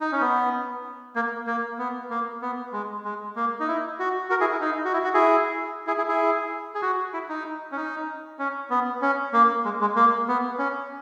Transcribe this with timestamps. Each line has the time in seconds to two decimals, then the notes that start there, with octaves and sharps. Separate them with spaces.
0.01 D#4
0.12 C#4
0.21 B3
1.16 A#3
1.47 A#3
1.79 B3
2.10 A#3
2.42 B3
2.73 G#3
3.05 G#3
3.36 A#3
3.60 D#4
3.68 E4
3.99 F#4
4.30 F#4 A#4
4.41 E4 G#4
4.52 E4
4.61 D#4
4.85 F#4
4.93 E4
5.04 F#4
5.14 E4 G#4
5.87 E4 G#4
5.98 E4 G#4
6.08 E4 G#4
6.75 G#4
6.82 F#4
7.14 E4
7.29 D#4
7.72 C#4
7.77 D#4
8.39 C#4
8.70 B3
9.02 C#4
9.33 A#3
9.65 G#3
9.81 G#3
9.96 A#3
10.28 B3
10.59 C#4